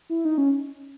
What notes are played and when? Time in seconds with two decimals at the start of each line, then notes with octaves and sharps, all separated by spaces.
0.09 E4
0.25 D#4
0.38 C#4